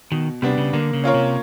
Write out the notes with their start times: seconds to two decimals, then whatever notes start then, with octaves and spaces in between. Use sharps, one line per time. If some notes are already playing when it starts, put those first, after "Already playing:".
0.12 B2 D#3
0.42 C3 G3 B3 D4
0.58 C#3
0.73 D3 A#3
0.93 C#3
1.04 C#4 F4 A#4 C#5
1.14 C3